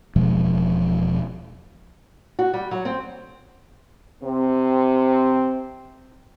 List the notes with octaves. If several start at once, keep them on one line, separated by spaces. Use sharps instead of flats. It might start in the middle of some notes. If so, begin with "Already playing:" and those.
E1 B2 F3 G#3
F#4
G3
F#3
C4
C3 C4